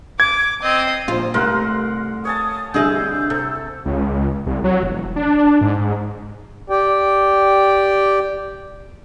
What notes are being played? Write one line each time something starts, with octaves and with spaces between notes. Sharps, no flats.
D6 G#6
C4 D#5
A#1 A#2 F4 C5
C2 A3 A#4 F5 F#5 C6
C#5 G#5 A5 D#6
C2 D3 G3 D4 G#4 D#5 E5 G6
C3 A4
C#2
C2
F#3
E1
D4
G#2
G4 D5 G5